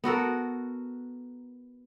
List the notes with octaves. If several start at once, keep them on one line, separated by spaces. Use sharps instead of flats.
B3 F#4 A4 A#4